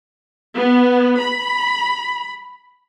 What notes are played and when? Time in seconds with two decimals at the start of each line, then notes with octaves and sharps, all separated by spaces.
0.55 B3
1.19 B5